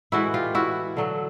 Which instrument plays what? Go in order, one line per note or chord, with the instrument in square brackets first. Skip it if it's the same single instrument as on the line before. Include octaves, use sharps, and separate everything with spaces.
[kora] A2 E3 G#3 E4 F#4
F4 G4
E4 F#4
D3 F#3 A3